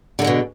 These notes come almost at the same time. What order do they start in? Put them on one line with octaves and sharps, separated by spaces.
D3 A#3 G#3 B2